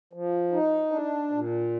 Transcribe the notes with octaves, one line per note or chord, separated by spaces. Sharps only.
F3
D#4
D4
A#2